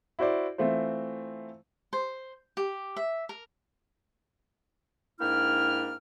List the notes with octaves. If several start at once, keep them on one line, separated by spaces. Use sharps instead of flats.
E4 F#4 C5 D5
E3 A3 C4 F4 C5
C5
G4
E5
A#4
G#2 A#3 D4 E4 G5 F6